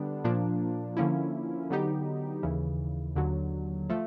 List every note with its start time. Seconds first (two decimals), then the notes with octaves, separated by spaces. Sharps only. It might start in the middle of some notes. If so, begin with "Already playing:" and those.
Already playing: D3 G3 B3 D4
0.24 A#2 F3 A#3 D4
0.97 D3 F3 A#3 C#4 E4
1.70 D3 F#3 B3 D#4 G4
2.43 D#2 C#3 E3
3.16 D#2 D3 F#3
3.90 F3 A3